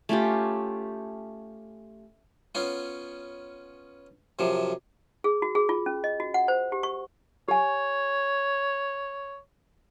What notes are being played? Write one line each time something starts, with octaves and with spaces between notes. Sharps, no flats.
A3 C#4 F4 G4
B3 C#4 F4
F#2 C3 F3
G#4
F#4
G#4
F4
C#4
D#5
F#4
F#5
C5
G4
C#6
G4 C#5 G#5